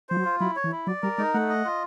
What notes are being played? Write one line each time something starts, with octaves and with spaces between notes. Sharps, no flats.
F3 C5
F#3
F4
F#3 E4
C#5
E3
E4
F#3 D5
G3 A#4
G#3 D#4
A3 F#5
D#5
F4